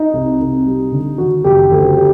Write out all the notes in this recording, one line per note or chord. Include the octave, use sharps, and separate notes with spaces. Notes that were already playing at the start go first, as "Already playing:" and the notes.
Already playing: D#4
C2
C2
G3
D3
D#3 F#4
F#1 G4
D2
G3